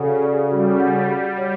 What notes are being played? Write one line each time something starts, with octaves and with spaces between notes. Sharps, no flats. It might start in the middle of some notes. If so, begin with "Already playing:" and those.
Already playing: C#3 F#4 A4 D5 F#5
D5
G3 F#4
G3 F#5
G3 G4
C#5